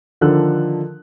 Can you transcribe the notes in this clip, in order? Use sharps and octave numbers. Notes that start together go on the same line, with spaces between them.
D3 D#3 F3 A4 F#6